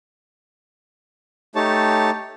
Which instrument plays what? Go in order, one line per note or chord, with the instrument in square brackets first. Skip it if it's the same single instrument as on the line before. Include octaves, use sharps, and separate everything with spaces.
[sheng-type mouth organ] A3 D#4 G4 C#5 A5